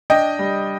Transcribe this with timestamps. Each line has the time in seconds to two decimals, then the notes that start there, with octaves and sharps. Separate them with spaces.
0.10 D4 D#5 G5
0.39 G3